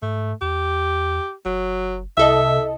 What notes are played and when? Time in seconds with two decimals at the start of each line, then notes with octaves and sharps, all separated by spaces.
0.02 G#2 A3
0.42 E2 G4
1.46 F#1 F#3
2.17 C2 C3 A4 D#5 E5